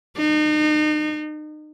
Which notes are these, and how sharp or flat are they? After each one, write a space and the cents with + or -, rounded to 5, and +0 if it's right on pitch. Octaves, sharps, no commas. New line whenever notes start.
D#4 -40